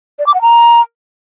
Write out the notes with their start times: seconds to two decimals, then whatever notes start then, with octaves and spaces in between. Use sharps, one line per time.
0.19 D5
0.27 D6
0.34 F#5
0.42 A#5